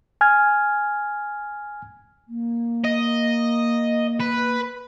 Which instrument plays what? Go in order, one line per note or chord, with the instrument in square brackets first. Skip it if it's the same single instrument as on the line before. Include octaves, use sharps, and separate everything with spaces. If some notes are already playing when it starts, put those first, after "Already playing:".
[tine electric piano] G#5 F6 G#6
[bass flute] A#3
[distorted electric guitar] D#5
B4